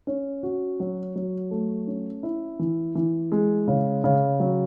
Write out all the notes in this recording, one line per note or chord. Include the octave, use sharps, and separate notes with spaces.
C#4
F#4
F#3
F#3
A3
C#4
E4
E3
E3
G#3
C#3
C#3
F#3